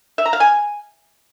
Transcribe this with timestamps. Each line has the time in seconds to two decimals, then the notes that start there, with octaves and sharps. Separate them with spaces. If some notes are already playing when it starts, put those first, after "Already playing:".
0.18 E5
0.26 A#5
0.33 F5
0.40 G#5